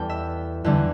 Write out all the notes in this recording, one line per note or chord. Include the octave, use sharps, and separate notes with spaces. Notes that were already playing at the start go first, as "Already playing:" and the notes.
Already playing: E2 E3 G3 A4 G5
E5
E2 D3 G3 E4